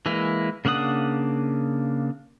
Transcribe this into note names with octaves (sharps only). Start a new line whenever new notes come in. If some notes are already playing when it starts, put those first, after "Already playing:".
E3 G#3 A#3 E4
C#3 A#3 D4 F#5 D#6